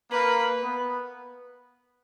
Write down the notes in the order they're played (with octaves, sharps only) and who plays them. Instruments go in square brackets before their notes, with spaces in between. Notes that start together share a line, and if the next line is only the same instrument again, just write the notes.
[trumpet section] A#3 A#4 [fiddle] B4
[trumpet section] B3 B4